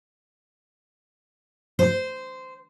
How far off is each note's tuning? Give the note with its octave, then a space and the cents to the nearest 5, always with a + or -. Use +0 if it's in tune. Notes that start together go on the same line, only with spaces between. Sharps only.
C5 -15